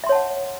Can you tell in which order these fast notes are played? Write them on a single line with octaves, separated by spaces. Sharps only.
E5 C6 C#5 A5 F#5